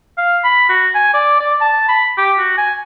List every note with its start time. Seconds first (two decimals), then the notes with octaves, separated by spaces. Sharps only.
0.18 F5
0.44 B5
0.69 F#4
0.95 G#5
1.14 D5
1.40 D5
1.61 A5
1.89 B5
2.18 G4
2.39 F#4
2.57 G#5